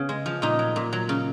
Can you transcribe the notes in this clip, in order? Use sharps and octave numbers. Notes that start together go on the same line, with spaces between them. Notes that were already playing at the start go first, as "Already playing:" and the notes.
Already playing: C#3 B3 C#4
G#3
F3
A#2 D#4
F#3
A#2
F#3
C#3